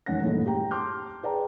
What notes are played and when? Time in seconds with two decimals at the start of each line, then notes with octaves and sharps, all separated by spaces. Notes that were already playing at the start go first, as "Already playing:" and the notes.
0.06 E1 D#3 C#4 F#5 A#6
0.23 G2 A#2 E3 A3 D#4
0.46 G4 G5 A#5
0.71 A5 C6 D6 F6 G6
1.23 G#4 B4 D5 G5 A5 A#5